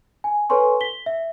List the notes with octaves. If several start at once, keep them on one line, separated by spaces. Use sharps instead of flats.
G#5
A4 B4 C#5 G#5 C6 C#6
B6 G7
E5